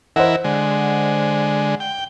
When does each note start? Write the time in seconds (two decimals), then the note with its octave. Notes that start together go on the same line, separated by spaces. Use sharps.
0.16 E3 E4 A#4 C5 D#5 F#5
0.44 D3 G#3
1.80 G5